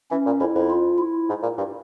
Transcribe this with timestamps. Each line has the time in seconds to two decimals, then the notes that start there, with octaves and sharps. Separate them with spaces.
0.11 E3 C#4
0.26 A#2
0.40 F2 E4
0.55 F2
0.70 F4
0.99 E4
1.29 G#2
1.43 A#2
1.58 G2